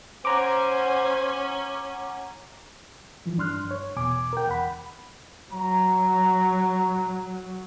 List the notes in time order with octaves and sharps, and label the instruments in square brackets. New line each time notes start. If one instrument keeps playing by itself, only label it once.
[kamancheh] C#4 G#5 [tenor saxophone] C5 [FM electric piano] F#5 A#5 D6
[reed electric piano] E3 F3
G2 D4 C6 F6 F#6
C#5
E2 B2 G#5 D6
A#4 G5
E2 F#5 B5
[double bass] F#3 [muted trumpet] A#5